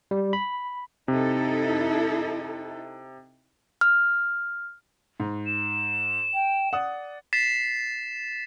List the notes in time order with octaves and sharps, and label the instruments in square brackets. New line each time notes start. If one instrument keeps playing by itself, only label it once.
[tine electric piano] G3
B5
[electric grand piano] C3 [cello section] D#4 E4 A4
[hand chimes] F6
[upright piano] G#2
[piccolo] E7
[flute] G5
[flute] D5 [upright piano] F#5 D#6
[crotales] A6 B6 C7 E7